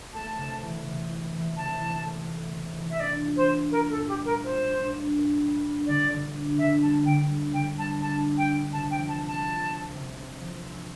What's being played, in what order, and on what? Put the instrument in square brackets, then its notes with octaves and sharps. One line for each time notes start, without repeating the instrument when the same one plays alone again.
[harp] A3 [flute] A5
[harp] C3
E3
C3
E4
E3
[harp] C3 [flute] A5
[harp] E3
A3
A3
C3
E3
[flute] E5
[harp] D4 [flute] D5
[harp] F4
[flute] C5
[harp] D4
[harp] F4 [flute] A#4
[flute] A4
[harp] A#2
[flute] G4
[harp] G3
[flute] A#4
[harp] F4 [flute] C5
[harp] D4
D4
A#2
G3
D4
[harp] D3 [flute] D5
[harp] D3
D4
[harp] D3 [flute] E5
[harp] G3 [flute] A5
[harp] D3 [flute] G5
[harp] G3
[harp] D3 [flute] G5
[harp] G3 [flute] A5
[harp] D4 [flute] A5
[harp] D4
[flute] G5
[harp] D4
[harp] C3 [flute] A5
[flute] G5
[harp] F3
[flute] A5
[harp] C4
[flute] A5
[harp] F4
C4
C3
C4
F3
C4